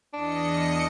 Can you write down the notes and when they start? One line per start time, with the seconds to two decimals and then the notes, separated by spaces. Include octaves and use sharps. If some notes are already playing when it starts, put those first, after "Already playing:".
0.14 E2 D4 D#5 C#7